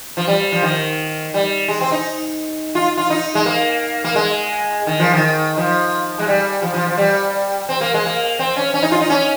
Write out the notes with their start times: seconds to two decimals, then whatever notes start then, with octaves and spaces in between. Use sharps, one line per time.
0.17 F3
0.28 G3
0.52 F3
0.63 D#3
1.34 G3
1.68 G#3
1.81 C4
1.92 D#4
2.75 F4
2.97 F4
3.10 D#4
3.35 G#3
3.46 A#3
4.04 A#3
4.15 G#3
4.87 D#3
5.00 F3
5.13 D#3
5.57 F3
6.19 G#3
6.27 G3
6.62 F3
6.74 F3
6.87 F3
6.98 G3
7.69 C4
7.81 A#3
7.94 G#3
8.06 A#3
8.39 C4
8.56 C#4
8.74 C#4
8.83 D#4
8.91 F4
9.01 D#4
9.10 C#4